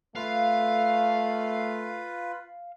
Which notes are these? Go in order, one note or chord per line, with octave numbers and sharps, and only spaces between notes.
A3 F4 B4 F5